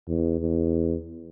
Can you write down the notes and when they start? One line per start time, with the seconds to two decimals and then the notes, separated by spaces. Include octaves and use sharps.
0.08 E2
0.40 E2